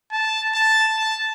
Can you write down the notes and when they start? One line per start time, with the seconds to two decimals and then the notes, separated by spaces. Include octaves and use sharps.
0.12 A5
0.54 A5
0.97 A5